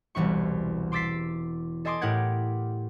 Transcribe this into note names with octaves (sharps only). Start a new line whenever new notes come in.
E1 C2 E3 E4 C#6
C6 D6 E6 A6 B6 C7
A4 D#5 G#5 C6 D6 D#6
A2 E4 G4 A#4 F#5 G#6